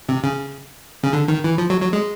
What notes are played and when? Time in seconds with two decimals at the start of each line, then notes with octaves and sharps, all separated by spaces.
0.09 C3
0.24 C#3
1.03 C#3
1.13 D3
1.28 D#3
1.44 E3
1.58 F3
1.70 F#3
1.81 F#3
1.93 G#3